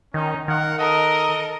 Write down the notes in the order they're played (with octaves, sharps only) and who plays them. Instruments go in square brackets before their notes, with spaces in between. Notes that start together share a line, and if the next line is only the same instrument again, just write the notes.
[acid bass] D#3 [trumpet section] C#4 D#4
[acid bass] D#3 [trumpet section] A#4 F5 F#5
[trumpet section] A4 D#5 [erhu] A#4